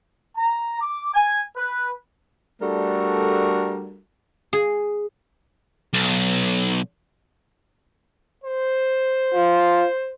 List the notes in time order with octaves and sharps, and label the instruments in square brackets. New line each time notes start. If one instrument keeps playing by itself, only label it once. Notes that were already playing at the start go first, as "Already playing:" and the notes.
[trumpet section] A#5
D6
G#5
B4
[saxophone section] G3 A3 D4 F#4 A4 A#4
[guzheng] G#4
[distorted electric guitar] B1
[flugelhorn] C5
[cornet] F4